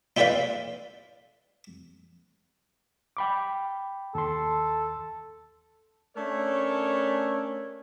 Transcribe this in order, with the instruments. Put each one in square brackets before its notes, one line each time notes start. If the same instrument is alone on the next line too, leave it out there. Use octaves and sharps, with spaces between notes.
[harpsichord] D#4 E4 G4 B4 D5 F5
[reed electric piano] G5 B5 D6
[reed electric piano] D#2 C6 [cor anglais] A4
[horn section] A3 C#4 D4 A#4 C#5